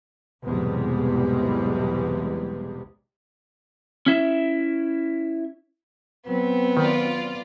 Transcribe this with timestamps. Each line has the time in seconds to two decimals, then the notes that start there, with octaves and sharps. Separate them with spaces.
0.44 B1 E2 G#2 C3 G3 G#3
4.06 C#4 E4 E5
6.27 F#3 B3 C4
6.77 D#3 F4 D5